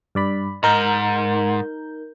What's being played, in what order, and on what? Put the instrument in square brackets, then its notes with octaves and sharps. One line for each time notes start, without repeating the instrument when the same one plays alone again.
[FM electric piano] G2 D5 B5
[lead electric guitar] G#2 [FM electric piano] D#4 A#4 G6